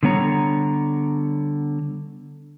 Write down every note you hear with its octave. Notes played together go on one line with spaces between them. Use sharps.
D3 G3 B3 C#5 A#5